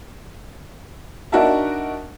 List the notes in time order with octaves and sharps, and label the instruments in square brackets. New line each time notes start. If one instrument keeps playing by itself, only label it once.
[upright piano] D4 D#4 F#4 A#4 E5 A5